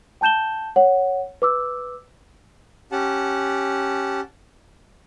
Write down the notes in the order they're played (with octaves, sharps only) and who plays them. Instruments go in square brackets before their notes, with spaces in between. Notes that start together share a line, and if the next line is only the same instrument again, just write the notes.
[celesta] G5 A5 G6 E7 G7
C#5 F#5
B4 D6 E6
[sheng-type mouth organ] C#4 G4 F#5 A5